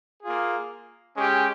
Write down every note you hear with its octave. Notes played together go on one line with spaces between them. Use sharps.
A#3 F4 G#4
G#3 C#4 G4